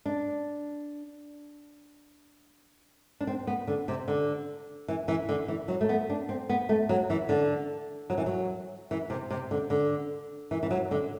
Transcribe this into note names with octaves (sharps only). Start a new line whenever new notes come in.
D4
D4
C4
B3
D3
C3
D3
E3
E3
D3
E3
F#3
A3
B3
D4
C4
B3
A3
F#3
E3
D3
F#3
E3
F#3
E3
C3
C3
D3
D3
E3
E3
F#3
D3